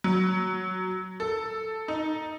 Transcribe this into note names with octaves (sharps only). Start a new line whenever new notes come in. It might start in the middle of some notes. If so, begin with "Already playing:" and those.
F#3
A4
D#4